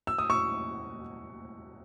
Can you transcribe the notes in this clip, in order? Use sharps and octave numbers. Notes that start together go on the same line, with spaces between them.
E6
D#6
C#6 E6